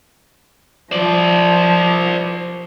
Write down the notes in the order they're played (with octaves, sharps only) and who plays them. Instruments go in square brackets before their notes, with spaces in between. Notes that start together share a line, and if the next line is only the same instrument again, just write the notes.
[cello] F3 [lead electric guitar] C5 D5